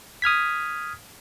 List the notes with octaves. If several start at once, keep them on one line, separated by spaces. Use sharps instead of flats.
D#6 F6 G#6 B6